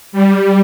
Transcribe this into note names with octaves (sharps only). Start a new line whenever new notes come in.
G3